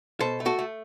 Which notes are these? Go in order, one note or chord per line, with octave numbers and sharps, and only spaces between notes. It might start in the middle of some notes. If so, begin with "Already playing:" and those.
B2 A4 C5
A3
F#4 A4
A3